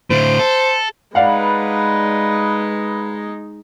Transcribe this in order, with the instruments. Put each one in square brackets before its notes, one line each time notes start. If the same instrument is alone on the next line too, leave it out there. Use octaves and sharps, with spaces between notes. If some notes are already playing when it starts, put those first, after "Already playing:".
[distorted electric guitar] A2 D3 [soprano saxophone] C5
[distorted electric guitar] A4
[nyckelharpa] G#3 D#4 [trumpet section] B4 [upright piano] D5 F5 F#5